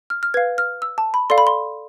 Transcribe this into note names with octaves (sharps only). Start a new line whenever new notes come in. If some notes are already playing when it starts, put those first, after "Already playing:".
F6
F6
B4 F5 G#6
F6
E6
A5
B5
A4 D5 F5 C6
B5
C6